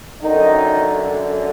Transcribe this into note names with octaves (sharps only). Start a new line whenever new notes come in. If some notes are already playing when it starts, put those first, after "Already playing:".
F#2 D3 D#3 D#4